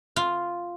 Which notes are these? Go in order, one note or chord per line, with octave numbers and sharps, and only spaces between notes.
F4